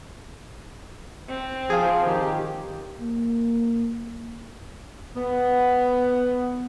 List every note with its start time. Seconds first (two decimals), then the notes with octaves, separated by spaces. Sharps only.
1.28 C4
1.70 F3 F4 G#4
2.06 D#3 G4
3.00 A#3
5.16 B3